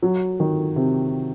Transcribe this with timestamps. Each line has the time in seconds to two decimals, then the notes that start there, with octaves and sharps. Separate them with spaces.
0.02 F#3
0.40 D#3
0.76 C3